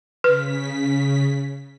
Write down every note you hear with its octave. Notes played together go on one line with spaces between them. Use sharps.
C#3 B4 B6